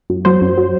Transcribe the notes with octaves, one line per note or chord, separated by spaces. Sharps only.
F#2
F#3 C5
F#2
F#3